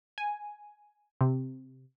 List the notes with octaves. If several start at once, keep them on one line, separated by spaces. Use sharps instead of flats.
G#5
C3